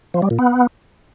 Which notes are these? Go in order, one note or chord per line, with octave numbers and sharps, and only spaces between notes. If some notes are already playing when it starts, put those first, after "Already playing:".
F3
G3
A#2
B3